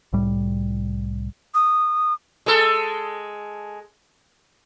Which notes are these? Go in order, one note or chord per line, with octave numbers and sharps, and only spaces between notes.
C2 A2 G3
D#6
G#3 A4